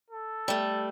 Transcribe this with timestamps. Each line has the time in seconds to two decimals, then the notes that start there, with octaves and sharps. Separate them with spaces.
0.10 A4
0.48 G3 A3